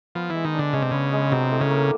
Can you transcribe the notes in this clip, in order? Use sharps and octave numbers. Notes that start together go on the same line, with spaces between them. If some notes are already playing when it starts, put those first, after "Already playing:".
F3 B3
E3 G#3
D#3
D4
D3
C#3 G#3
C3
C#3 B3
G#3
C3 F#3
A2
C#3
A#3